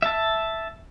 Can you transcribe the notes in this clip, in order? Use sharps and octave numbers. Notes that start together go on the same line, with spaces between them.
E5 A5